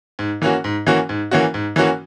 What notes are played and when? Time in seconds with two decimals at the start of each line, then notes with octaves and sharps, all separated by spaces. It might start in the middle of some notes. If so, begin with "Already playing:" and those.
0.19 G#2
0.42 E3 A#3 C#4 F#4
0.64 G#2
0.86 E3 A#3 C#4 F#4
1.09 G#2
1.31 E3 A#3 C#4 F#4
1.54 G#2
1.76 E3 A#3 C#4 F#4